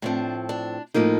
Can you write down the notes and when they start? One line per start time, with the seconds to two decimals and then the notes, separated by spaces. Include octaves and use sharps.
0.02 A2 F3 C4 D4
0.49 D4
0.94 A2 F3 A#3 D#4